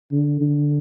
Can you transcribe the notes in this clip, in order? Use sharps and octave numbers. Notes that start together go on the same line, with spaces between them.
D3
D3